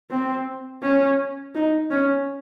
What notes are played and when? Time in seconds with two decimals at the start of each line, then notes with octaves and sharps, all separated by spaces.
0.11 C4
0.83 C#4
1.55 D#4
1.91 C#4